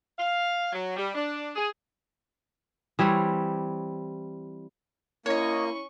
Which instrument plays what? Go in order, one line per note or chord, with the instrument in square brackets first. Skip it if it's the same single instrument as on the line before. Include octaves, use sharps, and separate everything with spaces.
[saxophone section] F5
F#3
G3
D4
G#4
[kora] E3 G3 C4 C#5
[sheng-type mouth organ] A#3 [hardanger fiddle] C#4 C#6 [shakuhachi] E4 [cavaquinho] C#5 D#5